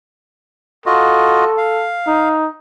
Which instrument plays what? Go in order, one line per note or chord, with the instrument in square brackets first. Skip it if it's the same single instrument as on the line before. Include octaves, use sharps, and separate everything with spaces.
[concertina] F4 F#4 D#5 [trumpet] A4
[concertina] F5
[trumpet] D#4